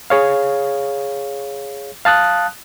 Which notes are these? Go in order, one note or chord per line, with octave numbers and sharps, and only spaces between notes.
G#4 C#5 F5
F5 A5 D#6 F#6